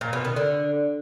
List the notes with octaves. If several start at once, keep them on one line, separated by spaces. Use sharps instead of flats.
A#2
B2
D#3
D3